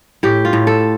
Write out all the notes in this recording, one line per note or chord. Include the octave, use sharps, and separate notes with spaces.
A2 G4
F4
A2
A4